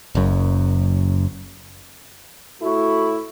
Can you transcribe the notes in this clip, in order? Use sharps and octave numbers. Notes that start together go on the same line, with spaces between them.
F#1 F#2
A2 A3 E4 F#4